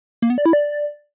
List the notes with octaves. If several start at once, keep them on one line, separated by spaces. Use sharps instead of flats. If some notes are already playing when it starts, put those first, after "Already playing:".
A#3
B3
D5
E4
D5